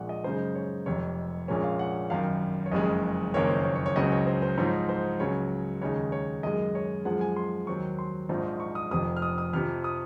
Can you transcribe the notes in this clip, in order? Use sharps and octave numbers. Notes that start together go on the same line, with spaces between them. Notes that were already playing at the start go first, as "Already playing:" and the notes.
Already playing: A#1 A#2 G#3 F#5
D#5
F#2 C#3 G#3 D#4 C5
C#5
F1 F2 C3 C#5
A#1 A#2 G#3 C#4
F5
F#5
G#1 F#2 D#3 F5
C#5
F#1 F2 C#3 G#3 D#5
F#1 F2 D#3 A#3 C#4 C#5
C5
C#5
C#5
C#5
C#2 C#3 F#3 C4 D#5
C#5
C5
C5
G#2 F3 C4 D#4 C#5
C5
C#2 C#3 F#3 C#5
D#2 C#3 G#3 D#4 C#5
C#5
F#2 D#3 G#3 D#5
C#5
F#2 F3 G#3 F#5
G#5
C6
D#2 D#3 F#3 C4 C#6
C6
A#1 G#2 F3 C4 D#4
C#6
D#6
F1 F2 C3 F3 D#6
F6
D#6
D#6
F2 C3 F3 F6
D#6